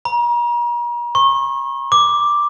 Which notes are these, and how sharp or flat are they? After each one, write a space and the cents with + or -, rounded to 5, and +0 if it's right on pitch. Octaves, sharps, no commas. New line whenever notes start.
A#5 +40
C#6 -35
D6 +0